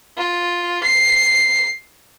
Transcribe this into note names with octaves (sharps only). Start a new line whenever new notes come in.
F4
C7